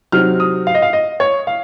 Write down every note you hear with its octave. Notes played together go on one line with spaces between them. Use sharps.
C3 F#3 C4 D#4 F6
D#6
F5
D#5
F5
D#5
C#5
F5